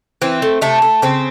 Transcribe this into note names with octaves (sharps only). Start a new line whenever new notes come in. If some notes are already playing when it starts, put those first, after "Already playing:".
E3 C4
A3
C3 A3
A3
C#3 C4